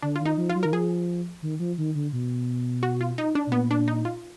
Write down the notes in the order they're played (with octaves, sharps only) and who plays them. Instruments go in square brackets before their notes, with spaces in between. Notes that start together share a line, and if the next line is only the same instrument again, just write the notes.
[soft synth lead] D3 [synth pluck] D4
[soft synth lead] D#3 [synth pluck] F4
[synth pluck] D#4
[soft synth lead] F3
[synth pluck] F4
[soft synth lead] F#3
[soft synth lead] D#3 [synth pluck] A#4
[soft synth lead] F3 [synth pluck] G#4
[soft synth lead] D#3
F3
D#3
D3
B2
[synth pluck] F#4
F4
D#4
D4
[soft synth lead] B2
[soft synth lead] A#2 [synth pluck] B3
[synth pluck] D4
D#4
F4